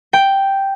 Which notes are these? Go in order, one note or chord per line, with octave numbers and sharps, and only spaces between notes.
G5